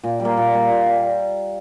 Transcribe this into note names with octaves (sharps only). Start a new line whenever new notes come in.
A#2
G3
A#3
A#2
G3 A#3
A#2
G3